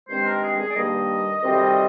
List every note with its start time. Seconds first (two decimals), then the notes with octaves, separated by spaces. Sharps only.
0.08 G2 D#3 G#3 C4 C5
0.25 A#4
0.42 G#4
0.58 G#4
0.69 D5
0.74 G2 D#3 G3 A#3 D#5
1.41 D2 C3 D#3 G3 C4